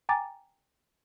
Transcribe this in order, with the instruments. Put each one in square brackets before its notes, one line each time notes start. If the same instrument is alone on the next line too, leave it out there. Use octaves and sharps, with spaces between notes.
[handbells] G5 G#5 A#5 D6 A6